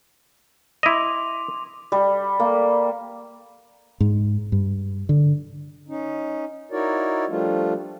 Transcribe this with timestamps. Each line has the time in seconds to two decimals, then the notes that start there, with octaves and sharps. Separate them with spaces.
0.83 E4 D#5 C6 D6 F7
1.92 G3
2.40 A#3
4.00 G#2
4.52 G2
5.09 D3
5.88 C#4 D#4
6.71 D#4 E4 F#4 A#4 C#5 D5
7.29 F3 G3 A3 D4 F4